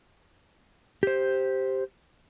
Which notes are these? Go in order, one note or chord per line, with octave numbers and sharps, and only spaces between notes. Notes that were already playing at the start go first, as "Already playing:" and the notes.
G4 C5